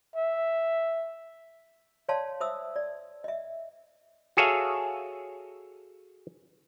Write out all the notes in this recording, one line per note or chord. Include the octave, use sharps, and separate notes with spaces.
E5
C#5 D5 F5 A5 C6
C5 E5 D#6 E6
D5
D#5 E5
F#4 G#4 A4 C#5 E5 F5